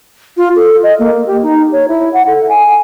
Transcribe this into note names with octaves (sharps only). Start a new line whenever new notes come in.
F4
A4
D#5
A#3
G4
D#4
C#5
E4
F#5
A4
G#5